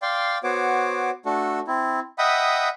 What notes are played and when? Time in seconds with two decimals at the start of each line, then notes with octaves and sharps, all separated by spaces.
0.02 D5 F5 G5 C6
0.43 B3 F#4 C5 C#5 D6
1.26 A3 D4 F#4 A4
1.67 C4 E4
2.18 D#5 E5 F#5 G5 B5 D#6